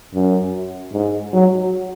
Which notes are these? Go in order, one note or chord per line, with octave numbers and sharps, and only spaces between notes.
F#2
G#2
F#3